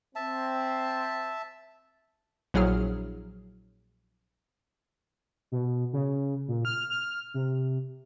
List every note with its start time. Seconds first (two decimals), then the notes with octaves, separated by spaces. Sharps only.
0.15 C4 E5 A5
2.54 A#1 F#3 E4 G#4 F6
5.52 B2
5.93 C#3
6.48 A#2
6.65 F6
6.90 F6
7.34 C3